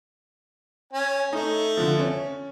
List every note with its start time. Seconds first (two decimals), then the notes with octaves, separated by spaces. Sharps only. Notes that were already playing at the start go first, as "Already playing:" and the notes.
0.93 C#4 G#5
1.33 A3 D#4
1.77 D3 F3
1.99 C#4